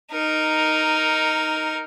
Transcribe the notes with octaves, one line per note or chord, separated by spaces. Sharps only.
D#4 A#4